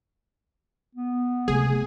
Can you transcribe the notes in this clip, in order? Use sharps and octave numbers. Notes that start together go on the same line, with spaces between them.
B3
C3 A3 G#4